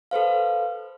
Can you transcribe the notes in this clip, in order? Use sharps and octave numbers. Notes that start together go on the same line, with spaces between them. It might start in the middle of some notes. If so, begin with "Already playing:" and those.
A4 B4 C5 F5